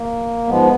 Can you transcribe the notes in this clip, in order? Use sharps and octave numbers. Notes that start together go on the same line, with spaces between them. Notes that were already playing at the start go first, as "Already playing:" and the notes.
Already playing: A#3
G#2 F3 G#3 B3